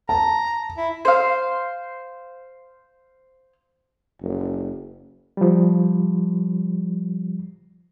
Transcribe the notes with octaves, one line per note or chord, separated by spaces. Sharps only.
A5 A#5
E4
C5 F5
F#1
F3 G3